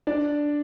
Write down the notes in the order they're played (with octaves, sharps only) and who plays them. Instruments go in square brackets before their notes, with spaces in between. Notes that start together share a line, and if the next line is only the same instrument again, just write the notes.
[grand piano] D4 D5